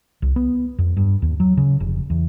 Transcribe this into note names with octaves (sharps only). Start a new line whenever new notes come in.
C2
B3
F2
G2
D#2
F#3
C#3
F1
E2